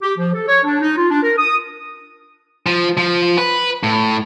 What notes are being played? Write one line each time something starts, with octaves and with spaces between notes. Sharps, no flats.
G4
F3
A4
C#5
D4
D#4
F4
D4
A#4
D#6
F3
F3
B4
A2